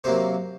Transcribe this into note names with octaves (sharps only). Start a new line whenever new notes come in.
C3 F#3 A#3 C5